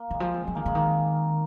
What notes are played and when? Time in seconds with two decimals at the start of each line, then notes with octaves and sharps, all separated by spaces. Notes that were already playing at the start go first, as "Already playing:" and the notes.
Already playing: A#3
0.10 D#3 G#3
0.20 F3
0.34 C4
0.47 F3 G#3
0.55 D#3 A#3
0.66 D3 G#3
0.75 D#3 A#3